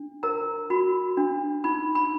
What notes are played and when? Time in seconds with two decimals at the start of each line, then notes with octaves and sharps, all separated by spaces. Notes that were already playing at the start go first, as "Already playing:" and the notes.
Already playing: D4
0.23 A#4 A#5
0.70 F#4 B5
1.17 D4
1.64 D#4 B5
1.95 B5